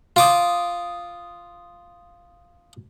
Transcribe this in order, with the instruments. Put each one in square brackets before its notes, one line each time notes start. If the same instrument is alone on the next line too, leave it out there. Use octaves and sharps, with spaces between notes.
[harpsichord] F4 D6 D#6